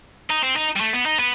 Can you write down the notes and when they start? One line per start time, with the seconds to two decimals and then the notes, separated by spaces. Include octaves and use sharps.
0.30 D#4
0.43 C4
0.56 D#4
0.76 G3
0.80 A3
0.93 B3
1.06 D#4
1.19 B3